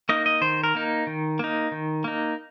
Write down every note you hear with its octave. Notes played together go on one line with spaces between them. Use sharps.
A#3 D#4 D#5
D#5
D#3 C5
A#4
A#3 D#4
D#3
A#3 D#4
D#3
A#3 D#4